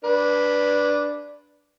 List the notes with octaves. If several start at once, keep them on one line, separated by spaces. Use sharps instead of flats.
D4 B4